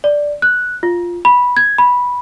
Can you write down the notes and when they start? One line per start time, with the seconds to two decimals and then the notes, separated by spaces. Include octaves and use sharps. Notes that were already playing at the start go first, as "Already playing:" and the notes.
0.04 D5
0.42 F#6
0.83 F4
1.25 B5
1.57 G#6
1.78 B5